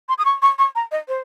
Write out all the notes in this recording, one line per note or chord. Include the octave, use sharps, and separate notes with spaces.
C6
D#6
C#6
C#6
C#6
A#5
D#5
C5